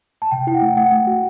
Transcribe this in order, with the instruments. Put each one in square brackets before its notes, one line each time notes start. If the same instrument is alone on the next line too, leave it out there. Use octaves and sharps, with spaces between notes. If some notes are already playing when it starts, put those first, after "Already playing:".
[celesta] A5
[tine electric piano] C3 [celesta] G5
[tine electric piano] E4 [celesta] G5
[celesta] F#5
[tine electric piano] A3
[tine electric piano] A3 [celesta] F#5
[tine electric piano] A3
F#4